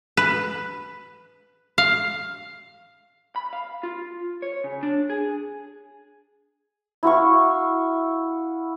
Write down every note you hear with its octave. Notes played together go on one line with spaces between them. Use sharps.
B4
F5
B5
F5
F4
C#5
C#3
D4
G#4
E4 F#4 F5 C#6